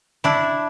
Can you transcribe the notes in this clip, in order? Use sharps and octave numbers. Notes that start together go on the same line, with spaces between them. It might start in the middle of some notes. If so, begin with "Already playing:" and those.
D4 E4